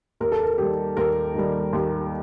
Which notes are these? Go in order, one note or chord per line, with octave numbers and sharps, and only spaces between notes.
D#2 A#4
A4
A#4
D#3 G3 G4
D#2 A#4
D#3 G3
D#2